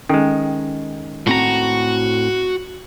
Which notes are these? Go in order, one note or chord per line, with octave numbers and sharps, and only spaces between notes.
D#3 G#3 C#4 A4 G5
A2 C4 F#4 A#5